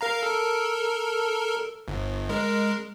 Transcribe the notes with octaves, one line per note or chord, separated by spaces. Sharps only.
A#4 F5 A#5
A4 A#4
G1
G#3 A#4